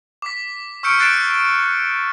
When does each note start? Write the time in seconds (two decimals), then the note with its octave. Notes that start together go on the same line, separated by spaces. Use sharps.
0.22 D6 B6
0.83 C#6 E6 F6 G6 C#7 D7
0.98 F#6 G6 A6 C7 D7 E7